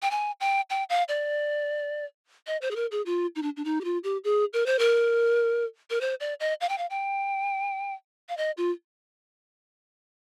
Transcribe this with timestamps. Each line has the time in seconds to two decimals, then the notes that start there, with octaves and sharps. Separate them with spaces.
0.02 G5
0.11 G#5
0.41 G5
0.70 G5
0.90 F5
1.09 D5
2.47 D#5
2.62 C5
2.71 G#4
2.76 A#4
2.91 G#4
3.06 F4
3.36 D#4
3.43 D4
3.57 D4
3.65 D#4
3.81 G4
3.84 F4
4.04 G4
4.24 G#4
4.53 A#4
4.66 C5
4.79 A#4
5.90 A#4
6.01 C5
6.20 D5
6.40 D#5
6.61 F5
6.69 G5
6.78 F5
6.90 G5
8.29 F5
8.37 D#5
8.57 F4